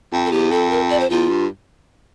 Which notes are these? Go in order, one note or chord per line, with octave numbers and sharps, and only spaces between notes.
F2
A4
E2 G4
F2 A4
A#4
D5
C5
E2 F4
G2